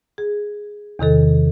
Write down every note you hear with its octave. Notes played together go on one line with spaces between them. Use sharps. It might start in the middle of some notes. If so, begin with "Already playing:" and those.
G#4
E2 C3 D#3 A4